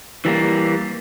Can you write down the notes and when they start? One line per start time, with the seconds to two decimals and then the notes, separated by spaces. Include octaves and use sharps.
0.25 E3 G3 A#3